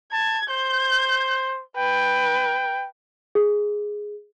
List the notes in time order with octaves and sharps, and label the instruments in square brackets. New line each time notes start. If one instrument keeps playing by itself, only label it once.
[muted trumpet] A5 [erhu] G#6
[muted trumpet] C5 [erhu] G6
[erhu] B4 [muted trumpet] G5
[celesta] G#4